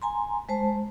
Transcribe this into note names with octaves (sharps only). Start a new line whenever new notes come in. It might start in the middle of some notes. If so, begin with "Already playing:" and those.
G#5 A#5 C6
G#3 C5 A5